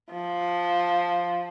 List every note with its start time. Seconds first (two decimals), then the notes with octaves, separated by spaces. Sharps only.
0.12 F3